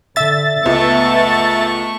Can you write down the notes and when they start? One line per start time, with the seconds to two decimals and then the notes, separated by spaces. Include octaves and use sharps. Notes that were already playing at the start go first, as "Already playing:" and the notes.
0.16 D3 E5 A6
0.66 C#2 A3 B3 C#6